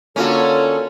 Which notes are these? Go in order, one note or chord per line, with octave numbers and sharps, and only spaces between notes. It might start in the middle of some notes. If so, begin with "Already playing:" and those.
D3 A#3 C#4 F4 F#4 A4